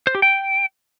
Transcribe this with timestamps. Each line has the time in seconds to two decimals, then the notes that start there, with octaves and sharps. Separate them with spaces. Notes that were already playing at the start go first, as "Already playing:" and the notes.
0.07 C5
0.15 G4
0.22 G5